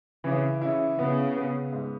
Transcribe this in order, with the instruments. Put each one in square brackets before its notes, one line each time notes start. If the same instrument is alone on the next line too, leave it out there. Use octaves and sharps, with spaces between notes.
[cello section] C#3 [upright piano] E3
[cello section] C#3 [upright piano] E4
[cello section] C#3 [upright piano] B3
[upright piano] B3
G#2